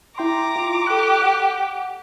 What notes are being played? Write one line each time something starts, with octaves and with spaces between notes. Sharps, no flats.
E4 G5 A#5 C6 D6
F4 C6
G4 A4 F#6
F#5